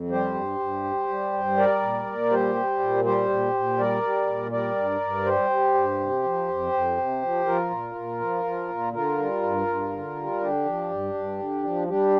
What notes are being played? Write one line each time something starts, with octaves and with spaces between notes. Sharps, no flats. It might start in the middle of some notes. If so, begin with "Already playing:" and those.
Already playing: F2
G3 G4 C5
G2
G2
G3
G3
G2
G3 A#4 D5
A#2
A#2
G3 G4 C5
G3
A#2
G3 G4 C5
A#2
A#2
G3 A#4 D5
G3
A#2
G3 A#4 D5
G2
G2
G3 G4 C5
G3
G2
C3
F3
F2
F2
C3
F3
F3 F4 A#4
A#2
A#2
F3
F3
A#2
D3 F4 A#4
G3
G2
G2
D3
G3
D3 D4 G4
F3
G2
G2
D3
F3
G3 D4 G4